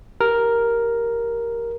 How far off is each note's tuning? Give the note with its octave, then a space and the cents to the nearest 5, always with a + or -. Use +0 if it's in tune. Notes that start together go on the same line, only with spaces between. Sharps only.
G4 +0 A#4 +0